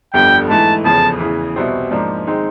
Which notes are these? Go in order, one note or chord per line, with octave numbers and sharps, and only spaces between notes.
G1 F2 D3 G3 G5
G#2 E3 A3 A5
F1 E2 C#3 F3 A5
E2 C#3 E3
C2 B2 G3 C4
G#2 F3 A#3 D4
D#3 G#3 C4 D#4